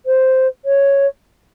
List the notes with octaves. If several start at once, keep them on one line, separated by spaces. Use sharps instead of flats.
C5
C#5